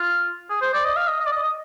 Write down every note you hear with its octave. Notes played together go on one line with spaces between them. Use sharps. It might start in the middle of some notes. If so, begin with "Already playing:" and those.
Already playing: F4
G#4
C5
D5
D#5
F5
D#5
D#5
D5
D#5
D#5